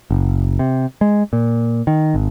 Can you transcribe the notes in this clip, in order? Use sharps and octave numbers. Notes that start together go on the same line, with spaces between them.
F#1
C3
G#3
A#2
D#3
G#1